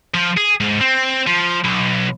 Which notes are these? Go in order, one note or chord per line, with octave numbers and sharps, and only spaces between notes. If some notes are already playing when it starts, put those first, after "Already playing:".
F3
G#4
G#2
C4
F3
B1